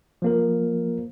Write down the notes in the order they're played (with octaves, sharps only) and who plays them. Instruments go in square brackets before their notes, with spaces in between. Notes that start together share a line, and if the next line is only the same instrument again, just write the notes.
[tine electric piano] F3 A#3 A#4